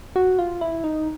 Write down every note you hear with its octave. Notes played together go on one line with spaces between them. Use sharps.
F#4
F4
E4
D#4